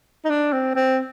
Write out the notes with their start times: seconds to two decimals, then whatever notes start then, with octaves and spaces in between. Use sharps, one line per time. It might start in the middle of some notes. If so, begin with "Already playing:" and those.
0.25 D#4
0.30 D4
0.53 C4
0.75 C4